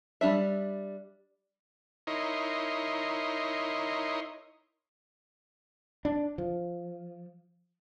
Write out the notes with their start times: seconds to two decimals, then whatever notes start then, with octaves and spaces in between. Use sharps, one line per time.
0.21 G3 D4 E5
2.07 D#4 E4 A#4 C#5 D#5 C6
6.05 D4
6.38 F3